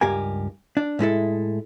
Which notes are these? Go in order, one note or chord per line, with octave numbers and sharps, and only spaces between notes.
C#2 G2 G4 A#4 G#5
D4
A2 G#3 E4 A4